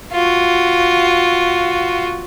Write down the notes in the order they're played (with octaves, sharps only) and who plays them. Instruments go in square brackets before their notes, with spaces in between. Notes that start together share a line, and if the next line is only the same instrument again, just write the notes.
[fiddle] F4 F#4